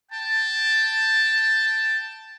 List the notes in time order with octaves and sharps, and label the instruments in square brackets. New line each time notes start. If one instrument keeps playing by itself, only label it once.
[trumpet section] G5 A5